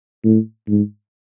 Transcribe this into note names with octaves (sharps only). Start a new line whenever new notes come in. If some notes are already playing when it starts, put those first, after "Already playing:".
A2
G#2